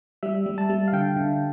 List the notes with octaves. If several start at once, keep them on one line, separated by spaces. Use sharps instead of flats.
G3 E5
G3
A5
G3
F5
D3 G5
D3